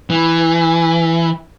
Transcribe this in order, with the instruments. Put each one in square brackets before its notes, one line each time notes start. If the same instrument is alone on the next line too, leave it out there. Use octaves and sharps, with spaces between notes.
[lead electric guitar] E3